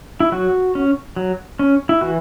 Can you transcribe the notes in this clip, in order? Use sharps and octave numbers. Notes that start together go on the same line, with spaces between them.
E4
F#3 F#4
C#4
F#3
C#4
E4
E3 F#4